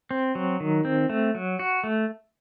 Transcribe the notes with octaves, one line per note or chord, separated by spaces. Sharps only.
C4
F#3
D#3
C4
A3
F#3
F#4
A3